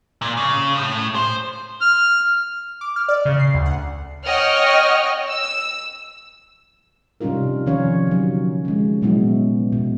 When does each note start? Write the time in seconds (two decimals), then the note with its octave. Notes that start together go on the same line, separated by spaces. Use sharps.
0.22 A#2
0.37 C#3
0.76 A2
1.15 C5
1.81 F6
2.81 D6
2.96 F6
3.08 D5
3.25 C#3
3.39 C7
3.54 D2
3.66 F#5
4.25 C#5 D#5 F#5 G5 F6
5.29 E6
7.21 C3 G3 C#4 D#4 F4 A#4
7.66 C3 D#3 F3 C#4 C#5 F5
8.07 D3 F#3
8.65 G#3 C#4
9.02 A#2 F#3 G#3 B3 E4
9.72 B2